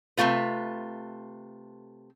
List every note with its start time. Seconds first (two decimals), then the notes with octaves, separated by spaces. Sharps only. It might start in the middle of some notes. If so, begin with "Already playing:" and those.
0.17 C3 F3 A3 F4 B4